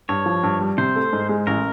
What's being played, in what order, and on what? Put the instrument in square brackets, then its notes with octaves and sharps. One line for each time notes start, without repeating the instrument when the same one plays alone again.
[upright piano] G2 [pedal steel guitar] C#5
[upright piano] F3
G2
G3
[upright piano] C3 [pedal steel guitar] C5
[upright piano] A3
G#2
G#3
[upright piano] A1 [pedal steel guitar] A#4